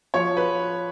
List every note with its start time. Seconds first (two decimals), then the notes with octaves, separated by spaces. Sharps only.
0.14 F3 C#5
0.37 B4